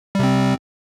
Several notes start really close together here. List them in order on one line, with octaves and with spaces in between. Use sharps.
G3 C3 C4